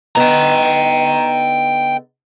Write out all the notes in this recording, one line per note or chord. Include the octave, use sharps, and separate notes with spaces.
D3 B3 D#4 G5 A#5